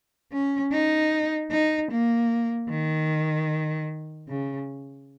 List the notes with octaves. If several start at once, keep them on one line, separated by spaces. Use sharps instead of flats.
C#4
D#4
D#4
A#3
D#3
C#3